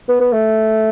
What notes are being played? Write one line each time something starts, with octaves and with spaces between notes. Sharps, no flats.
B3
B3
A3